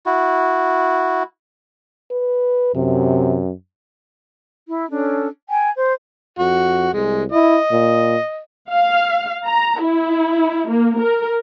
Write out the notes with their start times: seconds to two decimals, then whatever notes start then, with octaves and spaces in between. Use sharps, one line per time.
0.06 E4 F#4
2.11 B4
2.75 F#2 C3
4.66 E4
4.90 C#4 D4 A4
5.50 G5 G#5
5.76 C5
6.39 F2 F#4
6.93 C2 G#3
7.32 E4 D#5
7.72 A#2
8.71 F5
9.46 A#5
9.82 E4
10.69 A#3
10.99 A#4